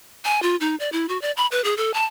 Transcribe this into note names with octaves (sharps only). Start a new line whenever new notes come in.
G#5
F4
D#4
D5
E4
F#4
D5
B5
B4
G#4
A4
A5